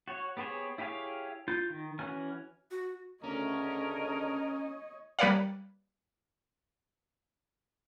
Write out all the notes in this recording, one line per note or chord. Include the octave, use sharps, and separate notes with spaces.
F#4 C#5
B3 G4 G#4 C5 C#5
E4 G4 G#4 C#5 F5
F4 G6
D#3
E3 C#4 F#4 G#5 F6
F#4
D2 C#3 C#4 A#4 C#5 D#5
G3 A#3 B4 C#5 D5 F5